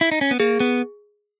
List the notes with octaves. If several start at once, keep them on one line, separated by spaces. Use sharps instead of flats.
E4
D#4
C#4
B3
A#3 G#4
B3